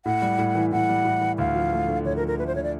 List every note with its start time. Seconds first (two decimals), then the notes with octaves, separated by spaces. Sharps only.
0.05 A2 F#5
0.22 G3
0.38 A2
0.55 E3
0.72 A2 F#5
0.89 G3
1.05 A2
1.21 E3
1.38 D2 F5
1.55 F3
1.72 A3
1.88 D3
2.05 D2 C#5
2.16 A#4
2.21 F3
2.27 A#4
2.38 A3 B4
2.47 C5
2.55 D3 C#5
2.63 D5